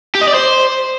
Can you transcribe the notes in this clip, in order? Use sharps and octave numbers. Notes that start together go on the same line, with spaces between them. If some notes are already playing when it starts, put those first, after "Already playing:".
G4
D#5
D5
C5